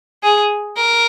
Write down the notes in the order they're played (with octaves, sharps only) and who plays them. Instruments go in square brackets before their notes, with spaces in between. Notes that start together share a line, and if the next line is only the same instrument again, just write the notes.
[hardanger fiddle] G#4
A#4